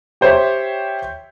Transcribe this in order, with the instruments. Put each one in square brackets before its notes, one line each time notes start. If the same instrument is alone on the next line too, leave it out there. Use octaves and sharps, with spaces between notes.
[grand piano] G4 C5 C#5 E5